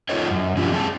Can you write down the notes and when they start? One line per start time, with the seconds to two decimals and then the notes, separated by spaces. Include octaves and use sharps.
0.09 D#4 F4 A4 C#5 D#5
0.31 F#2
0.57 F3 C#4 D4 E4 F4 G4
0.72 C4 G#4 G#5 A5